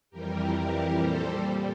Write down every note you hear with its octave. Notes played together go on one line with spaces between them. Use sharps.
F2 E3 G3 G4 A#4
G4 A#4
A#2 G3 A4 C5